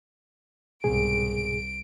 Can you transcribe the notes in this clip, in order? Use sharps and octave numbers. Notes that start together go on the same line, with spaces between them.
C2 G#2 B2 G#4 D7